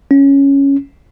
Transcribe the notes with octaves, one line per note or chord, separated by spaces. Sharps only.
C#4